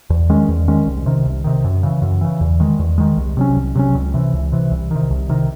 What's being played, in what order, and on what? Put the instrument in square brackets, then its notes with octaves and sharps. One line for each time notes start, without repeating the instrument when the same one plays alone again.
[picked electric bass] E2
D#3 G#3 C#4
E2
D#3 G#3 C#4
C2
C3 D#3
C2
C3 D#3
F#2
C#3 E3
F#2
C#3 E3
E2
D#3 G#3
E2
D#3 G#3
C2
C3 F#3 C#4
C2
C3 F#3 C#4
C#2
C3 E3
C#2
C3 E3
C2
C3 D#3
C2
C3 D#3